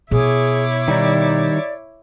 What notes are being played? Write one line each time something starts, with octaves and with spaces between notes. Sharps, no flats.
B2 E4 G#4 C#5 D6
D#3 G3 D#4 D5